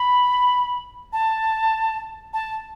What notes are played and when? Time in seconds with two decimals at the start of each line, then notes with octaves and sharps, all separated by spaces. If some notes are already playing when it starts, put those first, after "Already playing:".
Already playing: B5
1.13 A5
2.33 A5